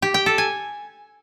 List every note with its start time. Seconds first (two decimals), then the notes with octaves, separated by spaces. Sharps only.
0.02 G4
0.14 G5
0.26 A4
0.38 G#5